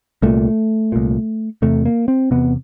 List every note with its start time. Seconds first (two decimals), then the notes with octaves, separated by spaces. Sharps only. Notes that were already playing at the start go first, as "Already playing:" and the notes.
0.22 C2 A#2 A3
0.92 C2 A#2
1.62 E2 C3 A3
1.85 A#3
2.08 C4
2.31 E2 C3 B3